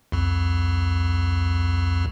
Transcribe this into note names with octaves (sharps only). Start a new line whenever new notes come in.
C2 F2